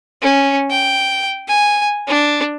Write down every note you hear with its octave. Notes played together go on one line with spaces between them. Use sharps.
C#4
G5
G#5
D4